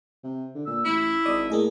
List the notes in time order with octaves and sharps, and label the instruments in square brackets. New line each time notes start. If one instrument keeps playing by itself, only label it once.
[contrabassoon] C3
D3
[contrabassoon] A#2 [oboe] E6
[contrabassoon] A1 [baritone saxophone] E4
[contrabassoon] G#1 [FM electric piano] D5 D#5 D#6
[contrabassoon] A2 [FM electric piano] A#3 G#4 D#5